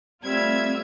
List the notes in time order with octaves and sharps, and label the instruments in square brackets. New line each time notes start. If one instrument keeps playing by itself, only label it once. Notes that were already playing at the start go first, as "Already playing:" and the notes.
[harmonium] G3 [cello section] A3 C4 [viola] F4 E5 [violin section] G#6